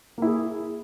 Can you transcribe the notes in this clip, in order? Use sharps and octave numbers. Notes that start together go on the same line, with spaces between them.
A#3 E4 G#4